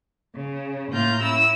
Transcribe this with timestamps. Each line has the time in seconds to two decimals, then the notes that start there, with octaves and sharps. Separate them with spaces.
0.35 C#3
0.91 A2 A#3 F4 A#5 G6
1.21 C#4 E4 E6